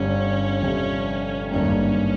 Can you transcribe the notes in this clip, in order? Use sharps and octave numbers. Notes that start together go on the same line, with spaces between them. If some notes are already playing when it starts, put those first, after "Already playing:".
Already playing: G1 G2 D3 G3 C#4
G1 F2 C3
G#1 G2 D3 G3 A#3 C#4